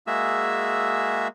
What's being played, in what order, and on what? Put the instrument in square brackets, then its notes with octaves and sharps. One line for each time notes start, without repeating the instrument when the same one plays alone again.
[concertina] G#3 A#3 F#4 G#4 E5 E6